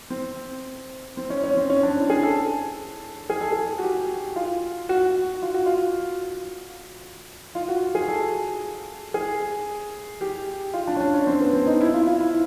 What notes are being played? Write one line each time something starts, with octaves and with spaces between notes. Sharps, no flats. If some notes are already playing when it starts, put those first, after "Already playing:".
C4
C4
C#4
C#4
C4
C#4
D4
E4
G#4
A4
G#4
A4
G#4
F#4
G4
F4
F#4
F4
F#4
F4
F4
F#4
G#4
A4
G#4
G4
F4
D4
C#4
D4
C#4
C4
B3
C4
D#4
E4
F4
F4
E4